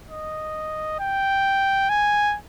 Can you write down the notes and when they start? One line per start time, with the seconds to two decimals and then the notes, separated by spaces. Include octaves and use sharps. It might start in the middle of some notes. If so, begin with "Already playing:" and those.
0.10 D#5
1.00 G5
1.89 G#5